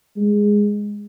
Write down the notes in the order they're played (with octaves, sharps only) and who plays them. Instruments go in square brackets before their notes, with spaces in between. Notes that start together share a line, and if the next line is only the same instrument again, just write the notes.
[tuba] G#3